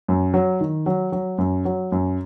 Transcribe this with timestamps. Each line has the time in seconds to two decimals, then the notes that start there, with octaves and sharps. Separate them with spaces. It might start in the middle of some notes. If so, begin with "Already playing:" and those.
0.08 F#2
0.34 F#3
0.61 D#3
0.86 F#3
1.12 F#3
1.38 F#2
1.65 F#3
1.92 F#2